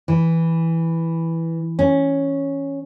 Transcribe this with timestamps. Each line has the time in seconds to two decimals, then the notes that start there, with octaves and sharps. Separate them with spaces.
0.08 E3
1.79 C#4